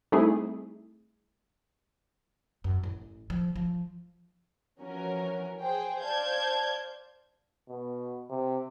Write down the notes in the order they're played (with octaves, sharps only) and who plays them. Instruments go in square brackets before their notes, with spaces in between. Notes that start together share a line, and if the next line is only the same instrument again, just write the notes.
[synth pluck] G3 A3 C4 D#4 E4 G#4
[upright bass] F#2
A1
F3
F3
[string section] E3 F3 C#4 F#4 A#4
G#4 C5 G5
C5 D5 F5 A5 G6 G#6
[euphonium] B2
C3